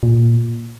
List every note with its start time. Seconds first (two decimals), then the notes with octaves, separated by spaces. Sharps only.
0.03 A#2